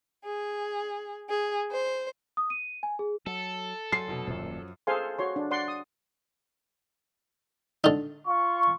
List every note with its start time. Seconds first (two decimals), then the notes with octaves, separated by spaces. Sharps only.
0.24 G#4
1.29 G#4
1.71 C5
2.37 D#6
2.50 D#7
2.83 G#5
2.99 G#4
3.26 F#3 A4
3.92 F#3 G#5 C6 A6 C7
4.07 F1 B2
4.27 D#1 F#2 A#2 F3 F#3
4.87 G#4 A4 C5 F5 G#5 C6
5.19 F#4 C#5 C6
5.36 D4
5.51 D5 F#5 C6
5.68 D#6
7.84 D3 D#4
8.28 F4 C#6